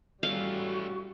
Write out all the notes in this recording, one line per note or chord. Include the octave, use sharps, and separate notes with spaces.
G3 A3 C#4 F#4 F5